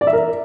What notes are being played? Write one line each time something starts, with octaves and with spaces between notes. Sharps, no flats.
D5
E5
A#4